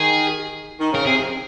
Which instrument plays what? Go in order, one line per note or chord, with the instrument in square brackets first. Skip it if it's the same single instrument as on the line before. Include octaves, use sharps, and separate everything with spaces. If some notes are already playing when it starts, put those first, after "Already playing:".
Already playing: [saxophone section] D#3 [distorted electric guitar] G#4
[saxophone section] D#3
[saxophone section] C#3 [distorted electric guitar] A#4
[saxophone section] C3 [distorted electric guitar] G#4